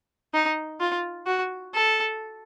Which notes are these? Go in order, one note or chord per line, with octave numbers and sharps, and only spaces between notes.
D#4
F4
F#4
A4